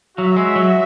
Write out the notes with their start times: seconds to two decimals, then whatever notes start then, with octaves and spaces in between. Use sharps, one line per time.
0.17 F#3 F#4 E5
0.36 G#3
0.56 F#3